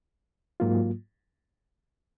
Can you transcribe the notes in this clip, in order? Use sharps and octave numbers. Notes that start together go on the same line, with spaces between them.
G#2 F#3 A#3 F4